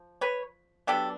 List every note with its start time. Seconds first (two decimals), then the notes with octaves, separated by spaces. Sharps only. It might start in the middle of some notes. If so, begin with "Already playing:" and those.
Already playing: F3
0.21 B4 C#5
0.87 F#3 B3 D4 G4 A4